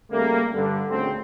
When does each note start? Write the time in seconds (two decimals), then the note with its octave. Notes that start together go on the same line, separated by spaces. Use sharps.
0.11 C#3 G3 A3 A#3
0.53 G2 D3
0.89 D2 A#2 C#3 A3 C4